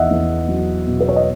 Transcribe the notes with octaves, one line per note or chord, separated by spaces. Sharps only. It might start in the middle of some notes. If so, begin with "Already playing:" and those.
Already playing: E2 D#5 E5 F#5
E2
F#3
B2
B4
C#5
D#5